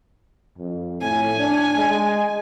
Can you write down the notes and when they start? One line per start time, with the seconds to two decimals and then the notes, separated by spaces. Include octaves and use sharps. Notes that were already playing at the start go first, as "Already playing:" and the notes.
0.58 F2
1.01 A2 G#5
1.38 D4
1.76 G#3